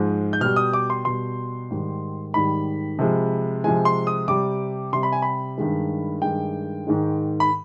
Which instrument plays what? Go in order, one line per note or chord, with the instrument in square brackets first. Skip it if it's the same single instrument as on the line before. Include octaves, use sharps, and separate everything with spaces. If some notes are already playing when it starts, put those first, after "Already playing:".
Already playing: [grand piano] G#2 F3 G#3
G6
B2 G3 F6
D#6
D6
C6
B2 G3 C6
G#2 D#3 G3
G#2 D#3 G3 B5
C3 F3 G#3
C3 F3 G#3 G#5
C6
D#6
C3 G3 D6
C3 G3 C6
B5
G#5
B5
G2 D#3 G#3
G2 D#3 G#3 G5
G#2 D#3 G#3
B5